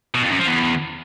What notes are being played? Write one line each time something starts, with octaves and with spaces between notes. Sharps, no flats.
B2
F2
F#2
F3
E2